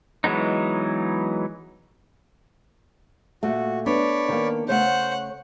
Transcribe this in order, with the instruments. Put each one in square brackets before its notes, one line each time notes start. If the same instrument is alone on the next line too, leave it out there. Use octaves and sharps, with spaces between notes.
[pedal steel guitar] E3 F#3 G#3 B3 D#4
[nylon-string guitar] A#2 [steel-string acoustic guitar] A3 [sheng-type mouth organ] F#4
[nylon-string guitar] B3 D4 [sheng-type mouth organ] C#5 D5 B5
[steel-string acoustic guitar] D#3 A#3
[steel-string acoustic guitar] C#3 A3 C#5 [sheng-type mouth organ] C5 [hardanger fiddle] F#5